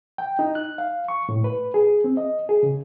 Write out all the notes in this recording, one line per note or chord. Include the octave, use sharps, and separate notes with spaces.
G5
D#4
F#6
F5
C#6
A2
B4
G#4
C4
D#5
G#4
C#3